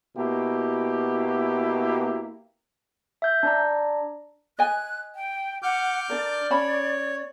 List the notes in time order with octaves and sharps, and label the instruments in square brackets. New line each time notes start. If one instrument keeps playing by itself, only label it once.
[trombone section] B2 A#3 E4 G4
[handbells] E5 G6
D4 D5 A#5
[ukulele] D#5 G#5 [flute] F#6
[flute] G5
[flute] F#5 [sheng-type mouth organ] D6 F6 G6
[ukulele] D4 A#4 [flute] D5
[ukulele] C#4 A5 B5 [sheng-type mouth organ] C#5